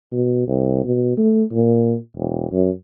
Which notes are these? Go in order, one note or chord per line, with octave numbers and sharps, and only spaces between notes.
B2
C2
B2
A3
A#2
E1
F#2